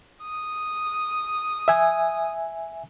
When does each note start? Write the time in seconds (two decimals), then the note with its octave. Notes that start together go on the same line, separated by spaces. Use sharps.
0.22 D#6
1.68 E5 G#5